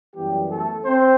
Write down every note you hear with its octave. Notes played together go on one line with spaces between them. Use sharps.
F#2 E3 G3 B3 G4
A3 A4
C4 C5